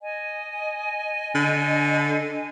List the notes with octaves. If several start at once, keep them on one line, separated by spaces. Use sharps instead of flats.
D#5 G#5
D3